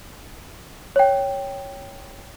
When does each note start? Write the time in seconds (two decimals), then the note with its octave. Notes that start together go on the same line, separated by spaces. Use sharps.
0.96 C#5 G5